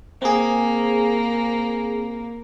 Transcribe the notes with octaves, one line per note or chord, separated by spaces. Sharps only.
A#3 C4 G#4